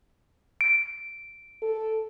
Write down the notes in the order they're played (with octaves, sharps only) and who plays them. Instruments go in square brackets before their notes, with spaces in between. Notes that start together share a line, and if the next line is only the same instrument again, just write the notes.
[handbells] D7
[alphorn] A4